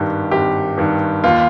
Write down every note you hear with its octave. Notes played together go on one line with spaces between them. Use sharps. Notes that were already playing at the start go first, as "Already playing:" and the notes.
Already playing: G#1 G2 D#3 G4
G#1 G4
G2 D#3
D#2 F4